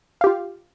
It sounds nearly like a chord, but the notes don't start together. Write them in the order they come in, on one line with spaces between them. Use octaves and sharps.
F5 G4 F4